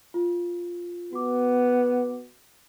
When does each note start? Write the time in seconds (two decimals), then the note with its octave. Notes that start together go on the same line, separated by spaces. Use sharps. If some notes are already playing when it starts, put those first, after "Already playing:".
0.14 F4
1.13 B3 F#4 D6